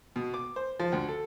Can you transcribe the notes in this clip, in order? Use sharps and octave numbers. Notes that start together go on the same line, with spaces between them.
B2
D6
C5
F3
D2
A4